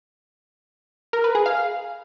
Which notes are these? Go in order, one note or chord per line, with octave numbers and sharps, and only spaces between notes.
A#4
B4
G#4
F5